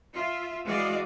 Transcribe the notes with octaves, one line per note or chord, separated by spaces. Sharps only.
F4 E5
E3 G#3 F#4 D5 D#5 F5